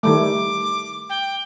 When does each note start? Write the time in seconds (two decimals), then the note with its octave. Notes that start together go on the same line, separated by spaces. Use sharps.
0.03 D#3 G3 A3 D6
1.10 G5